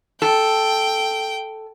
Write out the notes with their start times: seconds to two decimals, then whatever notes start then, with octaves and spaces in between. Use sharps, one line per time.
0.22 A4 G5